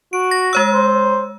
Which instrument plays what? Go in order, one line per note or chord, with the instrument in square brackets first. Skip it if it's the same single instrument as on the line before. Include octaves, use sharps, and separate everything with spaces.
[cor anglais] F#4 [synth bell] D7
[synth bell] A#6
G#3 C#5 E6
[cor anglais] C5